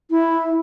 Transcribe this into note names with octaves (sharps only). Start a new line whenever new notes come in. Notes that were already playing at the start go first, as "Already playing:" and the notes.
E4